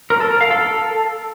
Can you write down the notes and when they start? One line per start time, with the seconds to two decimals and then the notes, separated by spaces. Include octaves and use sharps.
0.10 A#4
0.20 A4
0.31 A#4
0.41 F5
0.51 A4